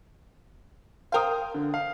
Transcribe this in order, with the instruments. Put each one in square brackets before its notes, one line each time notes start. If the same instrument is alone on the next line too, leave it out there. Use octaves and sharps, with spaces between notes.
[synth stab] A#4 F5 [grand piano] C5 G5 D#6
[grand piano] D3
F5